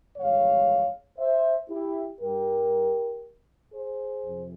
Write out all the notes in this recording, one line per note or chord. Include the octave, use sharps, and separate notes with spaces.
G1 F2 E3 G#3 C#5 F5
C5 E5
E4 G4
G2 G3 G4 A#4
G#4 C5
F2 C3